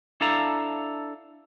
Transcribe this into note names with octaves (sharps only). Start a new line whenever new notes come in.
D4 E4 A4 F5 A#5